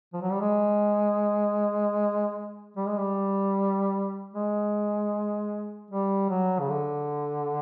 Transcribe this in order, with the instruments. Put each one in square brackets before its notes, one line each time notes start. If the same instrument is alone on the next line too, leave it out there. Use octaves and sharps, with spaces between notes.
[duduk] F3
F#3
G3
G#3
G3
G#3
G3
G#3
G3
F#3
C#3
D3